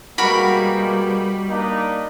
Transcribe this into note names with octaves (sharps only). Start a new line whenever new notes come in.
B2 G3 G#3 A#3 F#4 A#4 B5
A#3 D4 D#4